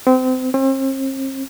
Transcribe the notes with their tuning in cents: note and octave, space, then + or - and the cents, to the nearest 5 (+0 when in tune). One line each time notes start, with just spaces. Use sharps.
C4 -30
C4 +40